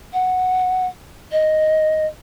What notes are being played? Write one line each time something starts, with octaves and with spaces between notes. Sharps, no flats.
F#5
D#5